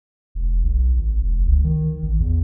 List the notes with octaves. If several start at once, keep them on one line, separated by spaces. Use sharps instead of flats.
E1
B1
G#1
E1
C#2
D#3
A1
E2